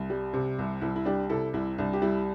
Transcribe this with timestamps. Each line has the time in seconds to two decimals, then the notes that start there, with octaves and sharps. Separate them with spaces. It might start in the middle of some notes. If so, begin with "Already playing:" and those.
Already playing: C2
0.10 G3
0.33 C3
0.59 C2
0.81 C2 E4
0.96 E4
1.05 G3 D4 G4
1.29 C3 E4 A4
1.53 C2 E4
1.78 C2 D4
1.93 G4
2.02 G3 E4